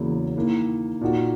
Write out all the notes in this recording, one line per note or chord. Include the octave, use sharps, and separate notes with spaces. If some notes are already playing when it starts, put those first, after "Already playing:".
Already playing: E2 C#3 F#3 A#3 E4
D#3 A#3 E4
A#2 A#3 D#4 F#4